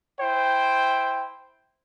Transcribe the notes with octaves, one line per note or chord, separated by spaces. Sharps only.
E4 C5 G5